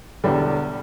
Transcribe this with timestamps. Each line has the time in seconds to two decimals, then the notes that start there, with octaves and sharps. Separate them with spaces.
0.24 E1 E2 D3 G3